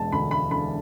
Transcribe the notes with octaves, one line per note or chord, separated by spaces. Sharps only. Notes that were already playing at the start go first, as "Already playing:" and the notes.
Already playing: E1 G#3 A5
D2 B5
B5
D3 B5